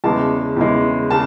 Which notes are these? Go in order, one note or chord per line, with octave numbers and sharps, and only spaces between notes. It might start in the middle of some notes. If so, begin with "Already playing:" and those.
E2 C#3 E3 G#3 A5
E2 C#3 E3 G#3
C#3 A5